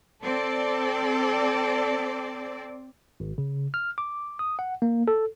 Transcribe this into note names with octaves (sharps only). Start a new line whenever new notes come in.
C4 A4 D5
G#1
C#3
F6
D6
D#6
F#5
A#3
A4